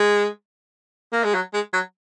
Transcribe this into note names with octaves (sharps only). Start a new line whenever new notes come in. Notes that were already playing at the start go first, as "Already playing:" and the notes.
Already playing: G#3
A#3
G#3
F#3
G#3
F#3